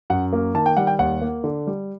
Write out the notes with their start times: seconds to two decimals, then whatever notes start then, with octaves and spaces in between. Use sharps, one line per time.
0.10 F#2 F#5
0.33 A#3
0.54 D#3 A5
0.66 G5
0.77 G3 F#5
0.87 G5
0.99 D#2 F#5
1.21 A#3
1.44 D3
1.67 G3